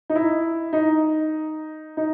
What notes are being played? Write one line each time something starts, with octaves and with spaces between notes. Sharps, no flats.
D#4
E4
D#4
D#4